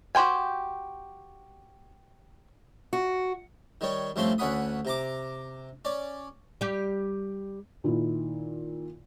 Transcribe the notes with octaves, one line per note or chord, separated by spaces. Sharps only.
F#4 G4 C5 G5 G#5
F#4
D#3 G3 C#5
G2 F3 A3 C4 C#4 C6
D2 D3 C#4 F#5 B5 D#6
C3 A#5 D6
C#4 D5
G3 G4
A#2 D#3 E4